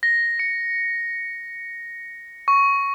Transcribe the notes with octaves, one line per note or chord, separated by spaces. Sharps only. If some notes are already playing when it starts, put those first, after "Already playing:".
A#6
C#7
C#6